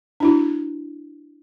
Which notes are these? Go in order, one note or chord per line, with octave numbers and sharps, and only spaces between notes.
D4 E4 F#4